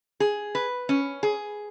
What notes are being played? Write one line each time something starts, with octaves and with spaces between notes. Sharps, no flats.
G#4
B4
C#4
G#4